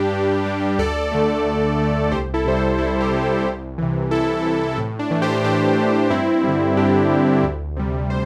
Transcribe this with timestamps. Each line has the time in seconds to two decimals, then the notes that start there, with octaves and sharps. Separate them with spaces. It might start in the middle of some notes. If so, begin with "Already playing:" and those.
Already playing: G2 G3 D4 G4
0.13 G2
0.46 G3
0.79 D2 A4 D5
1.12 D3 A3
1.46 D2
1.79 D3 A3
2.12 C2 G4 C5
2.34 E4 A4
2.45 C3 G3 C5
2.56 E4 A4
2.78 C2 E4 A4
3.00 G4 C5
3.11 C3 G3
3.22 G4 C5
3.45 C2
3.78 C3 E3
4.11 C2 E4 A4
4.44 C3 E3
4.78 A2
4.99 D4
5.11 E3 A3
5.22 G4 C5
5.44 A2 D4 G4
5.77 E3 A3
6.10 G2 C4 E4
6.44 D3 G3
6.77 G2 D4 G4
7.10 D3 G3
7.43 D2
7.76 C3 G3
8.10 C5